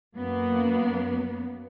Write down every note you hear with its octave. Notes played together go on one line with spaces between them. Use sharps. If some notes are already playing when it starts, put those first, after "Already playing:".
F#2 A#3 B3